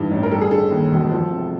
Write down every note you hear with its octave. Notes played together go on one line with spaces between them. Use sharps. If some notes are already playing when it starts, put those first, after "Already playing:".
Already playing: G2 E3 G3 D#4
A1
A#4
G3 A4
G#4
D3 A4
D#2
E1
F3
C3